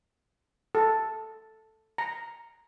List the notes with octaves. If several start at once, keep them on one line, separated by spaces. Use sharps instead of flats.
A4
A#5